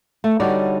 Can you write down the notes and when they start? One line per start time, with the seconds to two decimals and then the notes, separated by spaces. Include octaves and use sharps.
0.24 A3
0.40 D3 G3 D#4 F#4 C#5 D5